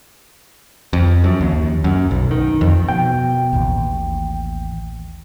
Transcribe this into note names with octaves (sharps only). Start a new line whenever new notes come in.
F2
F#2
D#2
F#2
B1
D#3
F2
B2 G5
A1 D#2